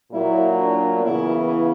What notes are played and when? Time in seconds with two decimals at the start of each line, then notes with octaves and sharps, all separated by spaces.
0.12 A#2 F#3 A#3 E4
0.57 D4
1.01 C#3 E3 B3 E4